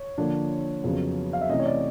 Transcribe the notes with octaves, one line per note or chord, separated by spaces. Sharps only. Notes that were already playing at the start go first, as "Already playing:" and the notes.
Already playing: C#5
D3 F3 A#3 D4
F2 C#3 F#3 B3
F5
E5
C3 E3 A3 C#4 D#5
C#5
D5